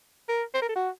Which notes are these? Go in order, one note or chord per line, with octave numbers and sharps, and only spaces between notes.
A#4
C5
A#4
A4
F#4